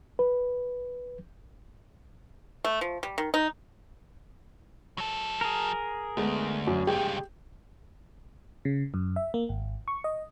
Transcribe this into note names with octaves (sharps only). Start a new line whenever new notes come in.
B4
A3
F3
G3
D#3
D#4
F#3 A4
G#4 A#4
D2 G#3 A3 B3
F#2
C#2 G2 G4 G#4 G5
C#3
F#2
E5
A#3
G#1
C#6
D#5